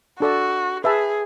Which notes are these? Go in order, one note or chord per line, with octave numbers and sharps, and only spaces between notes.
D4 F#4 A4 D5 A5
G#4 B4 E5 A5